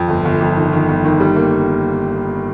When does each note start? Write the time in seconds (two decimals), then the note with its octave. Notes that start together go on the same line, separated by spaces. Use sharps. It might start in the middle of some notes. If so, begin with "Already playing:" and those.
Already playing: F2
0.08 G1
0.25 G1
0.41 F2
0.57 D#3
0.73 D#3
0.89 G1
1.05 D#3
1.20 G3
1.36 A#3